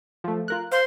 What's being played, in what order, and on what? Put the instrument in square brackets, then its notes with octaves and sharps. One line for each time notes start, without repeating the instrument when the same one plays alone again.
[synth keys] F3 A3
F4 A#4 F#6
[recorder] C5 [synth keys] F5